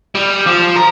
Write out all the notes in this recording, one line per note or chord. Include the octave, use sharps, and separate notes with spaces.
G3
F3
A#4